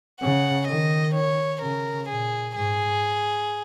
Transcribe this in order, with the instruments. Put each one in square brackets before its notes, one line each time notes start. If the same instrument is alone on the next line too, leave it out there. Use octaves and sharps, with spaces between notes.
[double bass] C#3 [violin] F#5
[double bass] D#3 [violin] D#5
[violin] C#5
[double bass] C#3 [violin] A#4
[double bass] A#2 [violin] G#4
[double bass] G#2 [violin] G#4